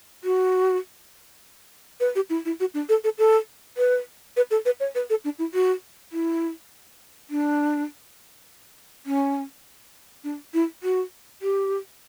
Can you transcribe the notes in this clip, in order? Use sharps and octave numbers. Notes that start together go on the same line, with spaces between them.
F#4
B4
G4
E4
E4
F#4
D4
A4
A4
A4
B4
B4
A4
B4
C#5
B4
A4
D4
E4
F#4
E4
D4
C#4
D4
E4
F#4
G4